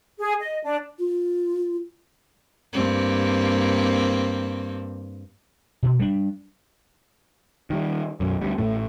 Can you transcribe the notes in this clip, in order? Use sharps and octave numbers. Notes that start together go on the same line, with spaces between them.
G#4
D#5
D4
F4
G2 A#3 C4
B2
G3 D4
D#3 G3
B1 F#2
D2 G3
A1 A2 A3